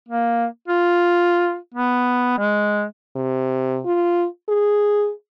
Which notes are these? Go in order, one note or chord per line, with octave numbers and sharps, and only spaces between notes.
A#3
F4
B3
G#3
C3
F4
G#4